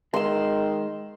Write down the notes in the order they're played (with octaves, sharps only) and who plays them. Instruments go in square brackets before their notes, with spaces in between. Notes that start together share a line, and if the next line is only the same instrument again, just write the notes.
[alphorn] D#3 [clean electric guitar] G#3 [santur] C6 E6